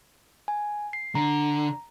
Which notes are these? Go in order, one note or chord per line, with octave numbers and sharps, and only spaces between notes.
G#5
C7
D3 A#5